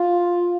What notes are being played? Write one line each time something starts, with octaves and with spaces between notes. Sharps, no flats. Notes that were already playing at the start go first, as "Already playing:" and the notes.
Already playing: F4